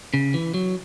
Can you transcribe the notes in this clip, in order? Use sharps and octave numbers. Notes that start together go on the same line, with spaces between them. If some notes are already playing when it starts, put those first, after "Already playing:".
C#3
E3
F#3